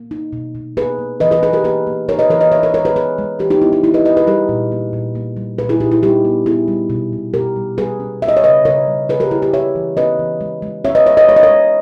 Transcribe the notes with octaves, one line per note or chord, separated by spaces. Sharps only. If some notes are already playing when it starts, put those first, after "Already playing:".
Already playing: A#3
D#4
B2
B2
A#3 G#4 B4
A#3
E3 B4 D#5
G#4 B4
D#4 G#4 B4
G4 A#4
A#3 G#4 B4
A#3
D#4 A#4 C#5
B4 D#5
E3 A#4 C#5
B4 D#5
D#4 C#5 E5
A#4 C#5
G#3 A#4 C#5
G#4 B4
G#3 G#4 B4
G#3
E3 G4 A#4
D#4 G4
B3 E4
D#4
E3 E4
B4 D#5
E3 B4 D#5
G#4 B4
G3 G4 A#4
A#2
A#3
A#2
A#3
G3
A#2 G#4 B4
E4 G#4
A#2 D#4 G4
E4
G3 D#4 G4
B3
B3 E4 G#4
G3
B2
B2
B2 G4 A#4
G3
G3 G#4 B4
C#4
C#4 E5
D#5
C#5
C#3 B4 D#5
C#3 A#4 C#5
G3
C#3 G#4 B4
G4 A#4
A#3 E4 G#4
G4 A#4
C#4 C#5 E5
E3
C#4 B4 D#5
E3
G#3
G#3
C#4 C#5 E5
B4 D#5
C#4 C#5 E5
B4 D#5
G#3 C#5
D#5
A#4 C#5
G#3